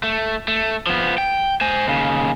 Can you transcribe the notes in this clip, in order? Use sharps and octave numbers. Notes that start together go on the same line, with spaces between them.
A3
A3
F3 B3
G5
C5 G#5
D#2 C#3